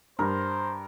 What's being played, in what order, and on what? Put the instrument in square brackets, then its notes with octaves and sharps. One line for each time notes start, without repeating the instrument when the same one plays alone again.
[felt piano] G2 [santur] A#4 [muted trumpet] C5